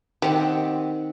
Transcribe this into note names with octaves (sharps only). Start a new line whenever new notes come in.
D#3 C4 G4 F#5